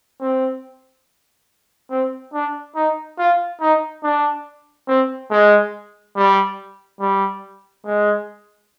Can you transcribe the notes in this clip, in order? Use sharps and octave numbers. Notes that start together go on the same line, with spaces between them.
C4
C4
D4
D#4
F4
D#4
D4
C4
G#3
G3
G3
G#3